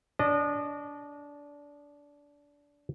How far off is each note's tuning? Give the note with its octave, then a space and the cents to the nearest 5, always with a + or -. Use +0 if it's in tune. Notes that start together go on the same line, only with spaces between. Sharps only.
D4 -20 D#5 -35